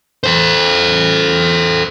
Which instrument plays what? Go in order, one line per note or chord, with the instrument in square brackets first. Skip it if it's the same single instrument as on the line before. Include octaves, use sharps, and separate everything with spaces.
[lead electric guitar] A4 C5